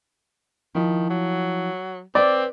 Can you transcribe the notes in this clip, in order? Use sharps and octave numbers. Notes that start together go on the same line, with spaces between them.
D#3 F3 E4
F#3
C4 B4 D5 E5